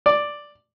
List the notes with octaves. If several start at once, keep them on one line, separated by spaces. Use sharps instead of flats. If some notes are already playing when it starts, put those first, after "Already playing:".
D5